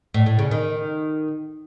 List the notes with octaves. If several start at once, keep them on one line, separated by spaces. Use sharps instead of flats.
A2
A2
C#3
D#3